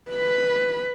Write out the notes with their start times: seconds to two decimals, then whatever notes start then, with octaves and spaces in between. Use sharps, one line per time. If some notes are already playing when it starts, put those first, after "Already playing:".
0.11 B4 B5